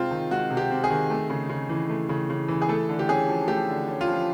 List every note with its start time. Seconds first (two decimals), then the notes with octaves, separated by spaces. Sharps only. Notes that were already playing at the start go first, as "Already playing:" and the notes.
Already playing: C3 G#3 C4 F4
0.11 D#3
0.31 G#3 F#4
0.50 C3
0.57 G4
0.71 C4
0.84 G#4
0.90 D#3
1.10 A3
1.30 C#3
1.50 C#3
1.69 E3
1.90 A3
2.09 C#3
2.30 C#3
2.48 E3
2.62 G#4
2.68 A3 A4
2.89 D3
2.99 G4
3.09 C#4 G#4
3.28 F3
3.48 A3 G4
3.68 D3
3.88 C#4
4.01 F4
4.08 F3